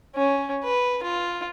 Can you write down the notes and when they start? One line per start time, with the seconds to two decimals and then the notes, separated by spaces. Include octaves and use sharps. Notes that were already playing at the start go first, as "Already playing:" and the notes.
0.15 C#4
0.64 B4
1.03 F4